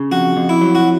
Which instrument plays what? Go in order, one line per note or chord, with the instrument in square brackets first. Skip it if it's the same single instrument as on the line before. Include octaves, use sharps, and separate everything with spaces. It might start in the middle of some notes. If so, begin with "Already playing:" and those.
Already playing: [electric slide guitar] C#3
[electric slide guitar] F2 [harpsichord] F#4
[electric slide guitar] F2
[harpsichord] E4
[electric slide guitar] F#3
[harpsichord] F#4